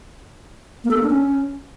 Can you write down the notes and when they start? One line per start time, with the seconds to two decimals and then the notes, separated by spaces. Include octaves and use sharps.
0.84 A#3
0.91 A4
0.97 A#3
1.04 D4
1.10 C#4